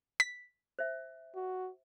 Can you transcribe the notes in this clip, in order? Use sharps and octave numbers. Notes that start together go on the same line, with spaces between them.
B6
C5 E5
F#4